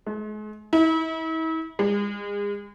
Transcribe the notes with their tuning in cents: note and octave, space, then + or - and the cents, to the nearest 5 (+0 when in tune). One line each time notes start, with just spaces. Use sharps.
G#3 +40
E4 -40
G#3 -35